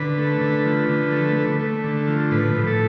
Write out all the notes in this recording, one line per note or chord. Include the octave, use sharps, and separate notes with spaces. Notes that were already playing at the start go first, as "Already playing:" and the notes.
Already playing: D3 B4
A3
D3
F3
D3
A3
A3
A3
D3
F3
A2 B4
A2
A4